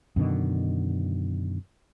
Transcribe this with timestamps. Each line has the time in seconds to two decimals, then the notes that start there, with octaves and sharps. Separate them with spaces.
0.16 F#2 B2 D3 D#3